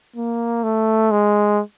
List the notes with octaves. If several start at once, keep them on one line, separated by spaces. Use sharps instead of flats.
A#3
A3
G#3